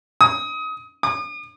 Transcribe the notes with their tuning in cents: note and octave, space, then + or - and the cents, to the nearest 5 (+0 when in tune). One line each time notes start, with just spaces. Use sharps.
D#6 +25
D#6 -45